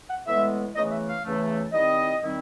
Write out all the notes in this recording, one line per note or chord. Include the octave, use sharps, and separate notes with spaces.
F#5
A2 E3 G#3 B3 E5
E2 C#3 E3 A3 D#5
E5
F5
E2 C#3 E3 A3
D#3 G3 C4 E4 D#5
D#3 G3 C4 E4